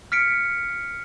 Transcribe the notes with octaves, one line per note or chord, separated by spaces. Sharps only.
F6 B6 C#7 D7